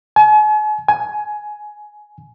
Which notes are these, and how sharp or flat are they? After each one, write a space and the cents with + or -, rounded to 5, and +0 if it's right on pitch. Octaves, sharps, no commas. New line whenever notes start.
G#5 +45
G#5 +15